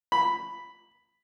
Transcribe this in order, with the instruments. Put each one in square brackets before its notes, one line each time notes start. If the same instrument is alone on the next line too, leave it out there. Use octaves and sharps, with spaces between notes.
[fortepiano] B5